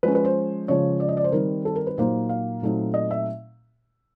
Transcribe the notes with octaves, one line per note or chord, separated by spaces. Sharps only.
F3 G#3 C#4 B4
B4
C5
C#3 F3 G#3 C#5
D5
D#5
D5
C5
D#3 G3 C4 D#4 A#4
A4
A#4
B4
A#2 F#3 A#3 D#4 C5
F5
A#2 F#3 A3 C4 D#4
D#5
E5